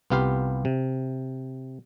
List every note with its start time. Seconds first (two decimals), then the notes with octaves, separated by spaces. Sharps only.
0.10 C2 B3 F4 G4 F5
0.65 C3